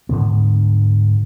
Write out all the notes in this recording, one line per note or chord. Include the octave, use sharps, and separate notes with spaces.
D2 G#2 D3 B3